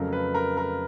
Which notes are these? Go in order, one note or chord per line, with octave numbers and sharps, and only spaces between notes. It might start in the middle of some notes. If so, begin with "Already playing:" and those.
Already playing: F2 C#3 F#3 A3 A#4
B4
A#4
A#4